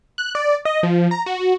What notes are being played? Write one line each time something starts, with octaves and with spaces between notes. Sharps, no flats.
F#6
D5
D#5
F3
A#5
F#4